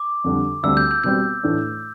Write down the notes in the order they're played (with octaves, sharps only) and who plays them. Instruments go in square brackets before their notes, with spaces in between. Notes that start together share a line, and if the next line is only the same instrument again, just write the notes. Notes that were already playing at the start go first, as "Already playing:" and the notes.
Already playing: [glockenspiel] D6
[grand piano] F2 D3 G3
[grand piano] D2 D3 G3 C4 [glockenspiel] E6
[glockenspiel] G6
G6
[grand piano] B2 G3 C4 [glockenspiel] G6
[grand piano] A2 E3 A3 D4